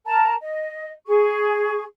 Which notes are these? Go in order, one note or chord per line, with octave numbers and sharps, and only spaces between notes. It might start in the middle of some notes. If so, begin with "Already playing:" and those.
A#4 A5 A#5
D#5
G#4 C#6